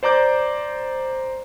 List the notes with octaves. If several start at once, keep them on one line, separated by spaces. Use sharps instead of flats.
C5 D5 A#5 D6 G6